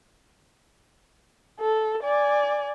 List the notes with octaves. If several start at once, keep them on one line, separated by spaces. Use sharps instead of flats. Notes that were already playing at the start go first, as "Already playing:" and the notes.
A4
D5 G#5